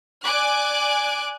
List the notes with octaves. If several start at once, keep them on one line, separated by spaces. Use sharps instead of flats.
D5 G#5 D6 F#6